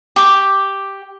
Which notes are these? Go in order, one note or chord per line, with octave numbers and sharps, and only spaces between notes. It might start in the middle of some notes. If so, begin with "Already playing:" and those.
G4 C#6 D6